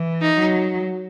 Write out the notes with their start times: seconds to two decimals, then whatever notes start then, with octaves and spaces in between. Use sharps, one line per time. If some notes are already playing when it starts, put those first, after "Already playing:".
Already playing: E3
0.22 D#4
0.37 F#3